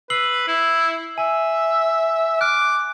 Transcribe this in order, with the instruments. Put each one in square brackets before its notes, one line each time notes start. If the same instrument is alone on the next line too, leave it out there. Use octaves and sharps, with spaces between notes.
[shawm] B4 [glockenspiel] E6 C7 F#7
[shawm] E4
[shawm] E5 [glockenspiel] G#5
[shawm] D6 [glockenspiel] F6 F#6